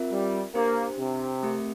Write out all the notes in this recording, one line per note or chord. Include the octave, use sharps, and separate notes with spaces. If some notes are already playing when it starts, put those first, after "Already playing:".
Already playing: C4 F4 A#4 E5
G3
A#3 D4 G4 C5
C3
A3 C4 G4 A#4 E5